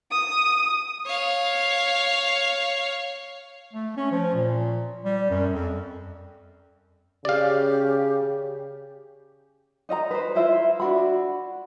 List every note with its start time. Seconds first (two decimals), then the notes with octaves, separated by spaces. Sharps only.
0.11 D#6
1.07 C#5 F5
3.73 A3
3.97 C#4
4.11 F3
4.34 A#2
5.05 G3
5.30 F#2
5.53 F2
7.25 C#3 G4 D5 F5
9.89 D#4 D#5 E5 A#5
10.11 B4 C5
10.35 E4 F4 C5 E5
10.80 D4 F#4 B5